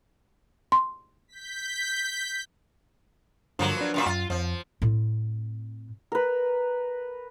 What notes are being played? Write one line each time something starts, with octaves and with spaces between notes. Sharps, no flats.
C6
G6 B6
G2 D3 F3 F#3 A#3
D4 B4
F#2 A#2 E5
F#2 F4 A6
F2 F3
A2 C4
A#4 B4